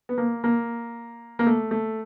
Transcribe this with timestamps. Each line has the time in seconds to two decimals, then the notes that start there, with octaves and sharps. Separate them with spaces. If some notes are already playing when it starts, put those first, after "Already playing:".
0.09 B3
0.18 A#3
0.44 A#3
1.39 A#3
1.46 A3
1.71 A3